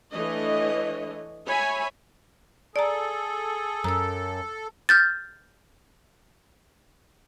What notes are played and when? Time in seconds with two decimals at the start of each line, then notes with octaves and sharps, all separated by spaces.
0.12 E3 A3 D4 C#5 D#5
1.47 C#5 E5 G#5 B5
2.76 G#4 A4 D5 A#5
3.84 F#2 A#5 E6
4.89 F6 G6 A6